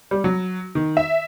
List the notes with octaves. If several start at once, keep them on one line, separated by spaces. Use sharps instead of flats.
G3
F#3
D#3
E5